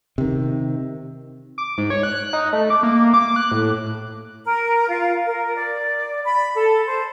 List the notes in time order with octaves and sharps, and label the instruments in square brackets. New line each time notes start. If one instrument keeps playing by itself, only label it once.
[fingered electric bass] C3 D#3
[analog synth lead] D6
G#2
C#5
F#6
D#4
A3
D6
A#3
D6
F#6
A2
[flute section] A#4
F4
A#4
D5
B5
A4
C5